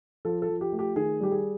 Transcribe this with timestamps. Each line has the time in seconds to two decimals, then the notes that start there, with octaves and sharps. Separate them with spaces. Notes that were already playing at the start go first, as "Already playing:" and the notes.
0.25 F3 A4
0.42 A4
0.49 F3
0.61 G4
0.73 A3
0.79 G4
0.96 D#3 G#4
1.20 G3 G4
1.31 G#4